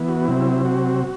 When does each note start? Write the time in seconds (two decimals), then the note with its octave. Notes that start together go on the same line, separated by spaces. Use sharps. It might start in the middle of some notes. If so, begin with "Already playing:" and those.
Already playing: E3 B3
0.09 F#4
0.28 C3 F#3 C4 E4
0.65 F#4